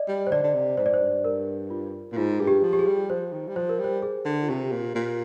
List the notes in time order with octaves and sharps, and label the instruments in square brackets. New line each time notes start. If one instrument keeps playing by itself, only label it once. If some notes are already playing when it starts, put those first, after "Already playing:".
Already playing: [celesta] D5 D#5
[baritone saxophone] G3
[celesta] C5
[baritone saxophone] D3 [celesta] D5
[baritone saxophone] D3
C3
[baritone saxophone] G#2 [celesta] C5
[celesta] D5
C5
[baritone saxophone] G2
[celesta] A#4
F4
[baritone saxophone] A#2
[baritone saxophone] G#2 [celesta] F4
[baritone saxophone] G2 [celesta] G#4
[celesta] G4
[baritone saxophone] F3
[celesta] G4
G#4
[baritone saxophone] G3
[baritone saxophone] F3 [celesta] C5
[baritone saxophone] D#3
G3
[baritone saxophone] F3 [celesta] C5
[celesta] A#4
[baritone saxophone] G3 [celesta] C5
[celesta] G#4
[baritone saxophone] D3
[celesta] F4
[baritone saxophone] C3 [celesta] G4
[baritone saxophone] A#2
A#2